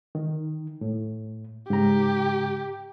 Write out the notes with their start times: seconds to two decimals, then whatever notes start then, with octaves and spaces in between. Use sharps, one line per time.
0.15 D#3
0.81 A2
1.70 G#2 C#3 G4 A#5